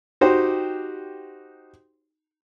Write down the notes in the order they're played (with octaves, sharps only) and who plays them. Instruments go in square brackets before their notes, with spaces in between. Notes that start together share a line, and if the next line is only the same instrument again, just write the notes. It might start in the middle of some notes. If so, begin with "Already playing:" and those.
[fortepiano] D#4 F#4 G4 C5